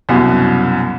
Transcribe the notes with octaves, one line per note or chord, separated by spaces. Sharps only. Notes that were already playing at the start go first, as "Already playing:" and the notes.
C2 F#2 B2